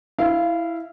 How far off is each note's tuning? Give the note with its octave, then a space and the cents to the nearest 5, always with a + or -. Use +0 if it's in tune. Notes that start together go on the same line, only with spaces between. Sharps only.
E4 +0 F5 -20